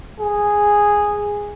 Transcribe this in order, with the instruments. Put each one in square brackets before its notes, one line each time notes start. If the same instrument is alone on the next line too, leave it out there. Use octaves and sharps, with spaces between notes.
[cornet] G#4